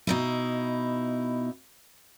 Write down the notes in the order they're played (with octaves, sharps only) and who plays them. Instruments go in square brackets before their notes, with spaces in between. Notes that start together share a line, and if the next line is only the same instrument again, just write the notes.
[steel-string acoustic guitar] B2 D#4 E4